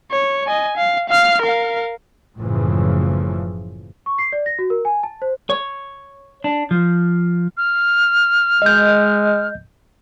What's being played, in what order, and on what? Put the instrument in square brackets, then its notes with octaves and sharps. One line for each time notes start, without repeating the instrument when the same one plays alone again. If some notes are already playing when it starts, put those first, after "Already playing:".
[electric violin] C#5
D#5 G#5
F5
F5 F6
A#4 F5
[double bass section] F#1 A2 C#3 E3 F3
[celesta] C#6
C7
D5
A#6
F#4
A#4
G#5
A5
C5
[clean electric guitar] C#5
D4
F3
[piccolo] F6
[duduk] G#3 [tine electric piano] D#5 G6